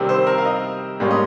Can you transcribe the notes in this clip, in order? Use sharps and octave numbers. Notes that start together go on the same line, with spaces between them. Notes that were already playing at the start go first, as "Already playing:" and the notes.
Already playing: C3 D#3 G3 C4
C5
A#4
F5
D#5
G#2 G3 A#3 C#4 F5
D#5